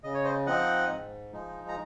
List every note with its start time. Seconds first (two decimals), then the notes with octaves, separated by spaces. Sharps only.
0.04 C#3 D#5
0.14 C#5
0.24 C5 D#5
0.46 F3 C4 D#4 D#5 F#5
0.90 G#2
1.33 F3 G#3 D#4
1.69 A#5